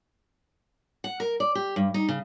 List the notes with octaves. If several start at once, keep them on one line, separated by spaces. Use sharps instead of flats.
F#5
A#4
D5
G4
G2
D#4
C#3